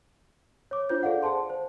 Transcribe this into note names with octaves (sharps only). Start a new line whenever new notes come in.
C#5 D6
D4 F4 C5 G6
G#4 A4 D5 F5 F#5
G#4 C5 A5 C6
C5